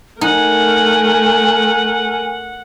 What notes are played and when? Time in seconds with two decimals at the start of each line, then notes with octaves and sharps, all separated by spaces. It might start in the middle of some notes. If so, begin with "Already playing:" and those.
0.21 A3 D#4 A#4 F#5 G#5